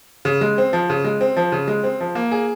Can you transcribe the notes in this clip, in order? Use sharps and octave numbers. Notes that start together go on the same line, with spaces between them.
C#3
G#3
C4
F3
C#3
G#3
C4
F3
C#3
G#3
C4
F3
A#3
G#4